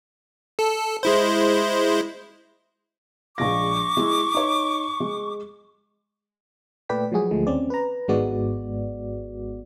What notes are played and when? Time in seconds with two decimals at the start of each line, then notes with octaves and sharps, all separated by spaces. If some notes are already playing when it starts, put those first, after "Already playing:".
0.59 A4
1.03 G#3 E4 C5
3.38 A#1 G#3 C#6 D6 A#6
3.97 G#3 E4
4.34 D#4 C#5
5.00 G#3
6.89 A#2 A3 B4 D5 G5 B6
7.12 F3 F#3 G#3 F#4 G#4
7.31 D2 F3 G#3 A3
7.47 D#2 C4 C#4 D5
7.70 B4 A#5
8.08 G#1 G#2 G#3 B3 F#4 D5